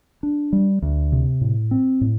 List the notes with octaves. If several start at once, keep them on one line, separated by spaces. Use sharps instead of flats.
D4
G3
D2
C3
A2
C4
A2